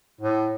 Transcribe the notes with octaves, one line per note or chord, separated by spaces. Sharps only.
A2